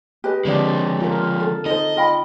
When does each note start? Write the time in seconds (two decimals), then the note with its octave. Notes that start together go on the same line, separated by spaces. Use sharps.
0.24 G4 B4 D#5
0.45 D3 F3 G#3 C4 D5
1.01 F4 A#4
1.40 A4
1.66 D#4 A4 C5 D#5
1.97 F4 G5 B5